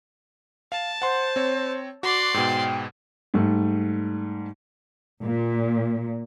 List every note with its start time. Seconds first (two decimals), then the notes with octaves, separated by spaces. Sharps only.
0.72 F5 A5
1.02 C5 F#5 C6
1.36 C4 C#5
2.03 F#4 D5 C6 D6
2.34 G#2 B2 G5
3.34 G#2 G3 A3
5.22 A#2